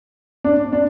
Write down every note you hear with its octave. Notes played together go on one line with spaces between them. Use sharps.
D4
D4